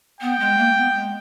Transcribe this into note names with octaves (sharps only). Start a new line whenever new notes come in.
B3 G5
G#3
A#3
B3
G#3